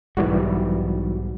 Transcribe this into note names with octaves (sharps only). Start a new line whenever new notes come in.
B1 G#2 E3 G3 F#4